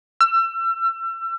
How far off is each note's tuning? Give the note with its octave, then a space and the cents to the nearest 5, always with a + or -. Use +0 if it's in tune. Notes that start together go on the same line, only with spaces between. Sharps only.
E6 +35